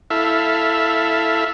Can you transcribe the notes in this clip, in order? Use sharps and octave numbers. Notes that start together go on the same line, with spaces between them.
E4 A4 E5 F5